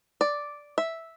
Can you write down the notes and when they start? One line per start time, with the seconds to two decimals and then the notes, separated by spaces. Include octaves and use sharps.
0.21 D5
0.78 E5